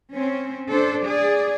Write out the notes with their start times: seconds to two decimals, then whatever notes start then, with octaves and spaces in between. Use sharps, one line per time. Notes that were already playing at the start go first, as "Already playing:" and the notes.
0.12 C4 C#4
0.70 D4 A4 C5
1.05 G#4 D5